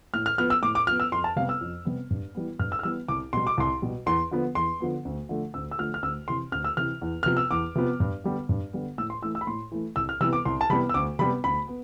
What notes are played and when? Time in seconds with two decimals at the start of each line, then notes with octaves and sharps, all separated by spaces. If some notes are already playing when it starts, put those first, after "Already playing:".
0.14 A2 F6
0.26 F6
0.38 F3 B3 F6
0.50 E6
0.63 A2 D6
0.75 D6
0.87 F3 B3 F6
1.00 E6
1.12 F2 C6
1.24 A5
1.36 C3 G3 B3 F5
1.49 E6
1.61 F2
1.85 C3 G3 B3
2.10 G2
2.35 E3 G3 B3
2.59 G2 F6
2.72 E6
2.79 F6
2.83 E3 G3 B3 E6
3.08 C2 D6
3.33 B2 G3 C6
3.47 D6
3.57 C2 C6
3.82 B2 G3
4.06 E2 C6
4.31 D3 F3 B3
4.55 E2 C6
4.80 D3 F3 B3
5.05 D2
5.29 D3 F3 A3
5.54 D2 E6
5.71 E6
5.78 D3 F3 A3 F6
5.94 F6
6.03 D2 E6
6.28 C3 E3 C6
6.52 D2 F6
6.64 E6
6.77 C3 E3 F6
7.02 E2
7.23 C3 F3 B3 F6
7.37 E6
7.51 E2 D6
7.75 C3 F3 B3
8.00 G2
8.24 D3 G3 B3
8.49 G2
8.73 D3 G3 B3
8.98 A2 E6
9.10 C6
9.22 E3 A3 E6
9.35 E6
9.41 B5
9.47 A2 C6
9.72 E3 A3
9.96 C2 E6
10.09 F6
10.21 C3 E3 G3 B3 E6
10.33 D6
10.45 C2 C6
10.61 A5
10.70 C3 E3 G3 B3 B5
10.89 E6
10.94 D2 D6
11.19 C3 G3 B3 B5
11.44 D2 B5
11.68 B3